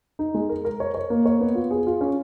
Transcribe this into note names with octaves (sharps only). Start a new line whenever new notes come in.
D#4
G#3
A#4
A#4
C#5
C#5
A#3
C#5
B3
F4
G#4
F4
C#4